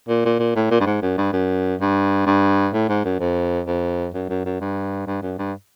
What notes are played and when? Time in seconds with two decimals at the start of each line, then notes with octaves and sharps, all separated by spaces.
0.09 A#2
0.25 A#2
0.40 A#2
0.56 A2
0.71 A#2
0.80 G2
0.86 G#2
1.02 F#2
1.18 G2
1.33 F#2
1.81 G2
2.26 G2
2.73 A2
2.89 G#2
3.05 F#2
3.20 F2
3.67 F2
4.14 F#2
4.29 F#2
4.45 F#2
4.61 G2
5.07 G2
5.22 F#2
5.39 G2